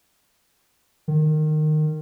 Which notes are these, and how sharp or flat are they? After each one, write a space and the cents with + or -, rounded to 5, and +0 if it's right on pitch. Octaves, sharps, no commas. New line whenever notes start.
D#3 -20